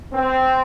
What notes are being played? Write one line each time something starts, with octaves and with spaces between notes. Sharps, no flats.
C4